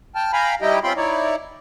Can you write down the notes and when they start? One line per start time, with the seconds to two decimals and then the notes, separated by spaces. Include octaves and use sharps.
0.15 G5 A5 F6
0.33 F5 G5 G#5 A#5 B5
0.62 G3 D#4 E4 G4 D#5 G5
0.84 C4 C#4 F4 G5 B5 C6
0.97 D#4 E4 C#5 D5